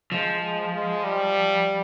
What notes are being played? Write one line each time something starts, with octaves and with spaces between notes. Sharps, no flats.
F3 G#3
G#3
G#3
G3